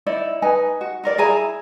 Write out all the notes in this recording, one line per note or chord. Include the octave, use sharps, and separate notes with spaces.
D#4 E4 D5
D#4 B4 G#5
F#4
D#4 A#4 D5
E4 G#4 G#5 A#5